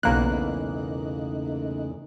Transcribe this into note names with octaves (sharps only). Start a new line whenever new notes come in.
B1 E2 C#3 A3 A#3 D#4 F#6